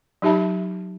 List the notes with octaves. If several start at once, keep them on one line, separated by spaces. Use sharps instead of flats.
F#3 D#4 G4 E5 A5 B5